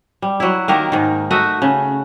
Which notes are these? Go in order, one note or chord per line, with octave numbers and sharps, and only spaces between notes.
G3
F#3 E4
D#3 A#3 G4 A#4
G#2 D#3
A3 F#4 D#5 E5
C#3